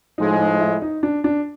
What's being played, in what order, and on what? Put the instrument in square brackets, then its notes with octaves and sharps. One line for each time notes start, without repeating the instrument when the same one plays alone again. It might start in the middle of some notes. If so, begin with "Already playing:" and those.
[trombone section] A2 F3 G#3 [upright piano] D#4
[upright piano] D#4
E4
D#4
D4
D4